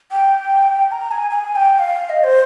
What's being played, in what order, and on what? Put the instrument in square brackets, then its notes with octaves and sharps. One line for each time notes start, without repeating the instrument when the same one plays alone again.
[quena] G5
A#5
G#5
G#5
G#5
G5
F5
D#5
C5